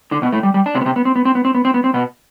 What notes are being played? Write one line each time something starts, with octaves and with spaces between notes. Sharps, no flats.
D3 D4
B2 B3
A2 A3
G3
G3
D4
C3 C4
B3
C3 C4
B3
C4
B3
C4
B3
C4
B3
C4
B3
C4
B2 B3